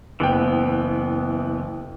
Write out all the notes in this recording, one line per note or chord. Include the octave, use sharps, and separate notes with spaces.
F#1 E3 B3 G5